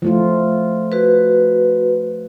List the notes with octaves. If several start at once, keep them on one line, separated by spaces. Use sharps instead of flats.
F3 A3 F4
F#4 B4